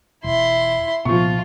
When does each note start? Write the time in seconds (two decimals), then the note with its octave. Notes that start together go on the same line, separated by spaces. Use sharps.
0.24 E1 E4 C6
1.05 C2 A#2 F3 B3 F4 C#6